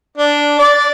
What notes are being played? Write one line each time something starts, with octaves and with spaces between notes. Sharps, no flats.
D4
D5